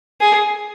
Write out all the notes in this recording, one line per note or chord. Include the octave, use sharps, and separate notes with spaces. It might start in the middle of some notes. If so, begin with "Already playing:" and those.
G#4